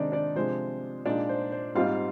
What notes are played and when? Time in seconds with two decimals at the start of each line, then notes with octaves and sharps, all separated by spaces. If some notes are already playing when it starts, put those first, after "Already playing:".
Already playing: C3 D#3 G#3 C4 D4 D#4 D5 D#5
0.12 D4 D5
0.35 C3 F3 G#3 D4 C5
1.06 A#2 G#3 D4 D#4 D5
1.29 C5
1.52 C5
1.75 G#2 G3 C4 D#4 F4 F5